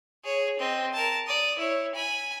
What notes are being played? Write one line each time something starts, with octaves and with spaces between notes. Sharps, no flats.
G#4 C#5
C4 D#5
A#4 A5
D5 D#6
E4 C#5
G#5 B5